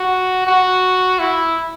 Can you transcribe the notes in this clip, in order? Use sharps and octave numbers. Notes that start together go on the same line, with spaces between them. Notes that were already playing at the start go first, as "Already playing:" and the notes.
Already playing: F#4
F#4
E4